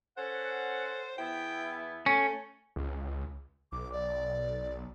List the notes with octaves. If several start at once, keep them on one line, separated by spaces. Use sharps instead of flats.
C#4 A4 C5 F#5
E2 B3 E4 G5
A3 C#4
C#2
B1 D6
D5